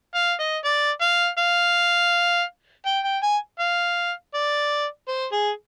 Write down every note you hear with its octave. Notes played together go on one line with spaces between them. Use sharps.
F5
D#5
D5
F5
F5
G5
G5
G#5
F5
D5
C5
G#4